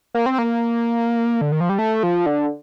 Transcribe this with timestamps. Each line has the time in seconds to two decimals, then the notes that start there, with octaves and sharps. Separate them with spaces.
0.14 A#3
0.26 C4
0.38 A#3
1.41 D3
1.52 D#3
1.60 F3
1.69 G3
1.78 A3
2.03 F3
2.26 D3